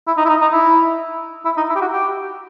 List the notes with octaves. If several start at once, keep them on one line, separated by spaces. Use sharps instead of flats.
E4
D#4
E4
D#4
D#4
E4
E4
D#4
E4
G4
F#4
G4